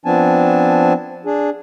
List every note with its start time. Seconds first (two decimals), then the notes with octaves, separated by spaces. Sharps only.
0.05 F3 B3 C4 D4 G#5 A5
1.26 D4 G#4